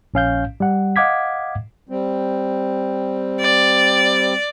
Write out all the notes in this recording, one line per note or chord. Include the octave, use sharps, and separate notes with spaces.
A#1 C#4 F5 G6
G3 F#5
D#5 F5 F#5 D6 G#6 B6
G3 C4
D5